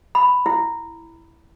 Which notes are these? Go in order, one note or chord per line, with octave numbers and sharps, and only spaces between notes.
B5
E4